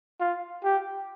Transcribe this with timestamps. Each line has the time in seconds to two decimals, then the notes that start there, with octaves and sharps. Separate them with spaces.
0.20 F4
0.64 G4